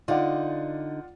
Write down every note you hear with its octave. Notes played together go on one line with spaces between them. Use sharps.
D3 D#4 F4 D5 F#5